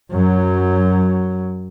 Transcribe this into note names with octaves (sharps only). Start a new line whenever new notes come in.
F#2 F#3